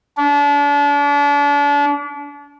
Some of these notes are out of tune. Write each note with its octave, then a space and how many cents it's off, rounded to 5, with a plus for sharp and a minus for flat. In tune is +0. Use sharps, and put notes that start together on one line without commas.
D4 -35